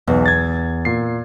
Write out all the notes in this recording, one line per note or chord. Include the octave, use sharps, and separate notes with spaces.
B1 E2
G#6 A6
A#2 C7